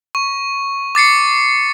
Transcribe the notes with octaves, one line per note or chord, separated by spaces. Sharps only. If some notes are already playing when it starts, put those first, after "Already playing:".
C#6
D6 A6 C7 C#7